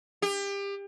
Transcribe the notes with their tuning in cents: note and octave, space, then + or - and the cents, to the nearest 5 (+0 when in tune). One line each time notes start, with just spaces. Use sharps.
G4 +30